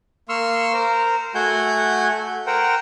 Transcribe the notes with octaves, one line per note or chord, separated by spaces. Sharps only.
A#3 C6 C#6 E6 F6
A#4 C5
A3 F#4 F#5 G#5 G6
A#4 C5 F#5 G5